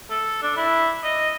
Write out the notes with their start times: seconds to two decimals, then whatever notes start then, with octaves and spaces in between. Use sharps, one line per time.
0.10 A4
0.42 D4
0.57 E4
1.04 D#5